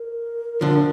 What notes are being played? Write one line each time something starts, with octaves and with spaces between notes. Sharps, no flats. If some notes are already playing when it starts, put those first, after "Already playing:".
Already playing: A#4
D3 F3